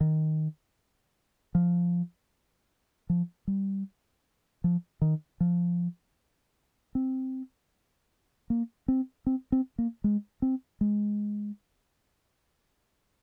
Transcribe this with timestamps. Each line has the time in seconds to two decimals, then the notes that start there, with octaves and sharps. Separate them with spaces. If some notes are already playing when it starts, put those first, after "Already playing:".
0.01 D#3
1.55 F3
3.10 F3
3.48 G3
4.64 F3
5.02 D#3
5.40 F3
6.95 C4
8.50 A#3
8.88 C4
9.27 C4
9.52 C4
9.78 A#3
10.04 G#3
10.42 C4
10.81 G#3